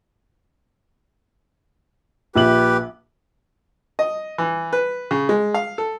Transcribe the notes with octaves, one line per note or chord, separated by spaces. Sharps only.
A#1 G4 B4 F#7
D#5
E3
B4
C#3
G#3
F5
A4